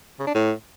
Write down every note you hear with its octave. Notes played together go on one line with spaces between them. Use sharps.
C#3
D4
A2